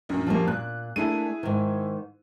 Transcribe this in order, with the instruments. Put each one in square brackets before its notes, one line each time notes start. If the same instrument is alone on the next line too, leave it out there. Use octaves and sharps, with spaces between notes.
[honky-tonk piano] A#1 F#2
[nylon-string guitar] F3 G3 A#3
[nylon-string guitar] A#2 [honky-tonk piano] F#6
[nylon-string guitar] A3 A#3 D4 [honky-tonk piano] E4 G#4 D#7
[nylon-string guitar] G#2 D#3